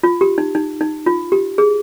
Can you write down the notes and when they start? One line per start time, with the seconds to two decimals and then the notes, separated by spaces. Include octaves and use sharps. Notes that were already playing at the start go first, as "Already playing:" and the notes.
0.03 F4
0.21 G4
0.38 D#4
0.55 D#4
0.81 D#4
1.06 F4
1.32 G4
1.58 G#4